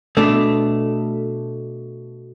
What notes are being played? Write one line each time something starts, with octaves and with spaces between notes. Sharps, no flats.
B2 A3 D4